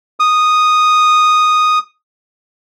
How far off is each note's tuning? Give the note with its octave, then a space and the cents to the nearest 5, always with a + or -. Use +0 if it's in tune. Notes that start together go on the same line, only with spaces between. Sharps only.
D#6 -5